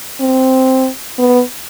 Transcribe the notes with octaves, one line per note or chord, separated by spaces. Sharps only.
C4
B3